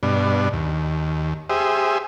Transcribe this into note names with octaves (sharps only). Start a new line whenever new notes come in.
G2 B2 D4
D#2
G4 G#4 C5 E5 D#6